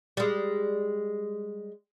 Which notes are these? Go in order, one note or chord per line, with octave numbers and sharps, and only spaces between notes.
G3 G#3